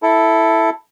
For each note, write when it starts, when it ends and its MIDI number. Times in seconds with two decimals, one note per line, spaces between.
0.03 0.70 64
0.03 0.70 69